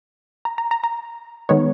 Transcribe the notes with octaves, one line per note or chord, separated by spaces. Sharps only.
A#5
A#5
A#5
A#5
D#3 G#3 B3 C#5